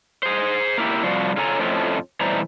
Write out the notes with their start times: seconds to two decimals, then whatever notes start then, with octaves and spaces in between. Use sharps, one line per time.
0.23 G#4 C5
0.78 A#3 E4 G4
1.03 C3 F3 G3 F#4 C5
1.37 C#3 F4 A4 C#5 G#5 A#5
1.59 F2 A2 F3 A3 C#4
2.21 B2 E3 G3 A3 C5 A#5